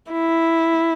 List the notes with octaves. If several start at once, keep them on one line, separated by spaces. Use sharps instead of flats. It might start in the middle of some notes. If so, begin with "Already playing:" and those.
E4